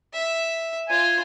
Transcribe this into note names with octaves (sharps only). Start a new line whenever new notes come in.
E5
F4 C5 G#5